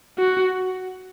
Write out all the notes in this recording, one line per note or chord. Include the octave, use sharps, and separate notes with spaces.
F#4